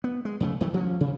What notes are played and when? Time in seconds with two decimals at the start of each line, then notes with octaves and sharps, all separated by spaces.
0.04 B3
0.25 G#3
0.40 F2 C#3 A3
0.61 F2 D#3 F#3 A3
0.73 D2 F3 C4 C#4
1.01 C3